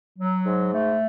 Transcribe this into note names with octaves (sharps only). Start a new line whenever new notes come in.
F#3
G#2
A3